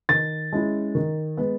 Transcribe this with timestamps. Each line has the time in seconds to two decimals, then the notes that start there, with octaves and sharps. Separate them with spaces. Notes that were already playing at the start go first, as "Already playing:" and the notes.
0.09 D#3 A6
0.52 G#3 C#4 E4
0.95 D#3
1.37 G#3 B3